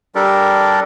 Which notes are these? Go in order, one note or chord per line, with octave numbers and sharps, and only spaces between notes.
G3 D4 G4 A4 A#4 D5